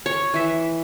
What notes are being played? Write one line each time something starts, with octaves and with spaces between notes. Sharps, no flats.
C#5
E3 E5